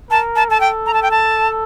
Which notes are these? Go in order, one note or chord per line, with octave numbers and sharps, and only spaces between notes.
A#4 A5
A5
A4 A5
G5
A#5
A5
G5
A5